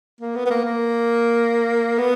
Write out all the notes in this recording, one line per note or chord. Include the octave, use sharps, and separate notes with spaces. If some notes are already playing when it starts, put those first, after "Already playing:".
A#3
B3
B3
A#3
A#3
B3